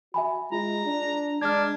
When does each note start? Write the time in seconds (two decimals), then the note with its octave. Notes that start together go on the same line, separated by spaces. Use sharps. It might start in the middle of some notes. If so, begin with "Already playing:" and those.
0.14 F#4 E5 G#5 B5
0.52 G#3 F4 A#5
0.86 D4
1.41 G#3 D4 F6 G#6